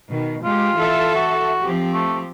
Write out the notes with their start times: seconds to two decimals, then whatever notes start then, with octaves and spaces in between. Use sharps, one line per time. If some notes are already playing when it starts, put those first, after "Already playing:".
0.10 B2 D#3
0.44 G#3 F4 G4
0.76 E3 A4 E5
1.15 F#4
1.62 F3 C4 G4
1.94 A3